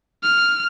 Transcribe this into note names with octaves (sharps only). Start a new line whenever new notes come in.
F6